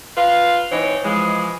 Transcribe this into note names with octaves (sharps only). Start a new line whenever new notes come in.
F4 B4 F5
E3 C4 D#4 C#5
E3 F3 G#3